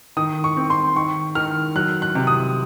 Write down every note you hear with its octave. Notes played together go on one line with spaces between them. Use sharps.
D#3 D#6
C#6
C4
C6
D#3 C#6
D#3 F6
F#3 F#6
F#6
C3
D#6